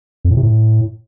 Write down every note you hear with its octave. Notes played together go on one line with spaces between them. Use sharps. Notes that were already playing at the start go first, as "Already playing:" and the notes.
F2
A2
C3
A2